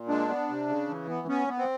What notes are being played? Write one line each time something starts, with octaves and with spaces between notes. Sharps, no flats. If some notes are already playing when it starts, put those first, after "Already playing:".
Already playing: A#2
G#3 D4
B3
C3
C#3
E3
B3
B3 C#4
B3
C4